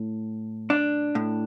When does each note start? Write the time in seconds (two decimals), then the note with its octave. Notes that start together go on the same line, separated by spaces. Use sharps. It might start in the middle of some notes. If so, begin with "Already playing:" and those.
Already playing: A2
0.70 D4
1.15 A2